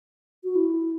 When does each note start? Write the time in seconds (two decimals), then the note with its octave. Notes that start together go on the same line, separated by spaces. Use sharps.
0.44 F#4
0.55 E4